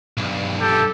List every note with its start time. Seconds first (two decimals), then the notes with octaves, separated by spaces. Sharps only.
0.17 B1 G2
0.61 G4 A4